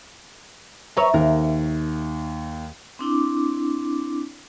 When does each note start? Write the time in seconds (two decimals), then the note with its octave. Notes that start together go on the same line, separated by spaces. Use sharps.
0.97 B4 C#5 E5 A#5
1.14 D#2 A#4
2.99 C4 D4 E4 D6